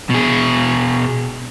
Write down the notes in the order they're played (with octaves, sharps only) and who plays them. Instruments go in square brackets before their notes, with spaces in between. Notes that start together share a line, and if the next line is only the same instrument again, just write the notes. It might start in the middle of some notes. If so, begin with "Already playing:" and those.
[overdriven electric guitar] B2 G#4